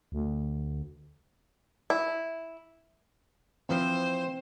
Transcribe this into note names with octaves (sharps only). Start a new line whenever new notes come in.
D2
E4
E3 F3 C4 B4 C5